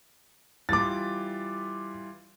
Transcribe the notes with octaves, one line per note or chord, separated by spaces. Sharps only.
E3 G3 F4 D6 A6